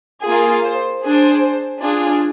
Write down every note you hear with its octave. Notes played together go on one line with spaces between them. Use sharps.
A#3 F4 G#4
C5
D4 G#4 C5
D4 F4 G#4